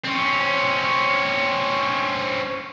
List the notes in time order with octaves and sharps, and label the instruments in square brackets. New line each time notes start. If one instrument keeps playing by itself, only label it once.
[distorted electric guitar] C4 C#4